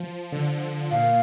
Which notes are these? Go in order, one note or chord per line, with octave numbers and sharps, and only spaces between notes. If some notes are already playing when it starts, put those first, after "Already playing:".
Already playing: F3
D3
A#2 F5